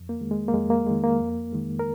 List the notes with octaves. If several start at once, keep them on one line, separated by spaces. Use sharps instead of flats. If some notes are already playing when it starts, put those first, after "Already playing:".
Already playing: F2
A#3
D#3 G#3
G#3
A#3
F2 G#3
A#3
D#3 G#3
A#3
F2
D#3 G#3
A#4